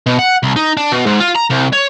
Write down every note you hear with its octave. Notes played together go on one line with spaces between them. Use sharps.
B2
F#5
C2
D#4
D4
B2
G#2
F4
A#5
C2
C#5